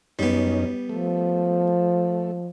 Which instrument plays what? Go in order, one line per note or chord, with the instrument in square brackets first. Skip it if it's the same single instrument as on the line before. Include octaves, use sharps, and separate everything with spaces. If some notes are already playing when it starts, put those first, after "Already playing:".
[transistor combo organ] F#2 C#4 D#4 [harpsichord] G3 B3
[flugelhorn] F3 [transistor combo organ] A3